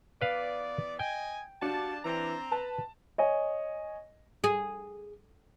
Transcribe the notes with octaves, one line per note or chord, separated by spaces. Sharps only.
E3 B3 B4 D5 F5
D#5 G5 G#5
G3 D4 F#4 F5 A5
E3 C4 A#5
B4 A5
C#5 D#5 G#5
G#4